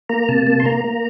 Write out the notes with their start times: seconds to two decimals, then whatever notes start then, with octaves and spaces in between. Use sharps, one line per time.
0.09 A#3 A#5
0.28 C3 A5
0.47 A#3 A5
0.60 C6
0.65 A#3 A#5
0.84 A#3